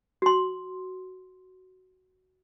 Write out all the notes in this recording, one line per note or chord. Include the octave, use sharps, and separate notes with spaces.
F#4 C6